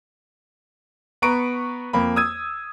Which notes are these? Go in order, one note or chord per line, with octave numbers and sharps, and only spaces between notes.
B3 B4 A#5 C#6 D7
F2 A#3 B5
D#6 E6 G#6 D#7